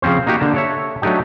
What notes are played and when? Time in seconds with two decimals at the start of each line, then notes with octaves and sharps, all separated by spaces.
0.02 C#3 F3 C4 C#4 C5
0.27 A#3 D#4 F#4 G4
0.40 D3 A#3 A5
0.54 A4 C#5 E5
1.02 F#3 A3 D4 D#4 G4